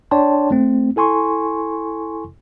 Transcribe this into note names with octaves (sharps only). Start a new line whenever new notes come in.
D4 C#5 D5 G5 A5 C6
A3 C4
E4 A4 G#5 C6 C#6